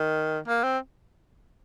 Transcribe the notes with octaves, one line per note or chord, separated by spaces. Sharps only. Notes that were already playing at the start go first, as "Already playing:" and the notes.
Already playing: D#3
A#3
C4